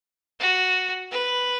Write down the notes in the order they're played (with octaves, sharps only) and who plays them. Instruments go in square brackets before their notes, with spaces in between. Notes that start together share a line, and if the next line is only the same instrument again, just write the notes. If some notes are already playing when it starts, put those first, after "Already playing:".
[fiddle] F#4
B4